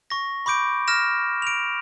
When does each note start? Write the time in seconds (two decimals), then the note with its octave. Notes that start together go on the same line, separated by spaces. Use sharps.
0.10 C#6 A#6
0.46 B5 C#6 D6 G6 D7
0.87 F6 A#6 E7
1.42 D7 F7